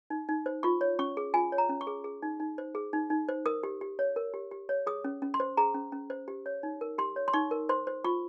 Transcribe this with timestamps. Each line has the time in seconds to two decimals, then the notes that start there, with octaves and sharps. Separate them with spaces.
0.10 D#4
0.29 D#4
0.46 C5
0.63 F4 C#6
0.81 C#5
0.99 C#4 C#6
1.17 G#4
1.34 F4 G#5
1.52 C#5
1.58 A#5
1.69 C#4
1.81 C#6
1.87 G#4
2.04 G#4
2.22 D#4
2.40 D#4
2.58 C5
2.75 G#4
2.93 D#4
3.10 D#4
3.29 C5
3.46 A#4 D#6
3.63 G4
3.81 G4
3.99 C#5
4.16 A#4
4.34 G4
4.51 G4
4.69 C#5
4.87 G#4 D#6
5.04 C#4
5.22 C#4
5.34 C6
5.40 C5
5.57 G#4 A#5
5.74 C#4
5.92 C#4
6.10 C5
6.28 G4
6.46 C#5
6.63 D#4
6.81 A#4
6.98 G4 C6
7.16 C#5
7.28 C6
7.33 D#4 C#6
7.51 A#4
7.69 C5 C6
7.87 C5
8.04 F4 C#6